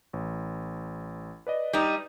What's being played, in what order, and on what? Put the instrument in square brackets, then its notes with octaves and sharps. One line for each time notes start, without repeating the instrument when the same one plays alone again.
[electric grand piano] A1
B4 D5 D#5
[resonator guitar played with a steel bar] G3 D#4